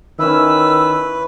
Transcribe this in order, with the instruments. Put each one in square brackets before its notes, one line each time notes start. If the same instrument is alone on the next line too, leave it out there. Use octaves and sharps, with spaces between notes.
[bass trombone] D#3 [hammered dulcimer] C#4 E4 [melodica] B4 [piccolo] E6